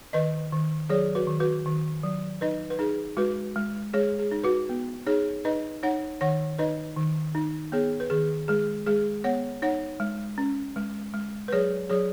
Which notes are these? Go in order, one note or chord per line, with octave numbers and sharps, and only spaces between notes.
D#3 B4 D#5
D#3
F#3 G#4 C#5
F#4 B4
D#3
F#4 B4
D#3
F#3
D#4 B4 D#5
B4
D#4 G#4
G#3 F#4 B4
G#3
G#3 G#4 C#5
G#4
D#4
F#4 B4
B3
D#4 G#4 C#5
D#4 B4 D#5
D#4 C#5 F#5
D#3 C#5 F#5
D#4 B4 D#5
D#3
D#4
B3 G#4 C#5
B4
D#3 G#4
G#3 G#4
G#3 G#4
B3 C#5 F#5
D#4 C#5 F#5
G#3
C#4
G#3
G#3
B4
F#3 G#4 C#5
F#3 G#4 C#5